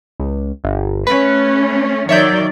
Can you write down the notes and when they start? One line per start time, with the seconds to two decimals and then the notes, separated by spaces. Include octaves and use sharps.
0.20 C#2
0.64 G1
1.07 A3 C#4 B4
2.09 D#3 F#3 C#5 D5 E5 G6